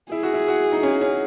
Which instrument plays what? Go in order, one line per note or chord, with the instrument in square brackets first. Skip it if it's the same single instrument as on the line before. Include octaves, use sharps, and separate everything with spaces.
[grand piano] E4 [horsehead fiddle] G#4
[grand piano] F#4
E4
F#4
D#4
C#4
C#4